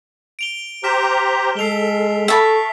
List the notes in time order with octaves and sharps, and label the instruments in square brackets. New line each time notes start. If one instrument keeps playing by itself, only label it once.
[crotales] D7 F7 G7
[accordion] G4 C5 A#5 [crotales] F6 B6 E7
[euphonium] G#3 [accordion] A4 [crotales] C7 F7 G7
[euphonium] A4 [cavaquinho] E5 A5 B5 [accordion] C#6 [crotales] B6